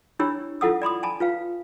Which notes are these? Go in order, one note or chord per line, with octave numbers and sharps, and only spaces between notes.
D4 E4 G4 C#5 B5 E6
E4 F4 A4 F#5 D#6 E6
D5 B5 C6 D#6
G#5 A5 B5
F4 B4 F5